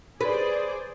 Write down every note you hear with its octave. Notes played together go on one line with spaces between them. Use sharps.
G#4 B4 C5 D5